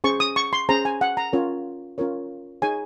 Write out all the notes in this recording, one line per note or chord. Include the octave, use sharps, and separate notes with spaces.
C#4 G#4 C5 C#6
D#6
C#6
C6
C#4 G#4 C5 A#5
G#5
F#5
A#5
C#4 F4 A#4 C#5
C#4 F4 A#4 C#5
D#4 G#4 C#5 G#5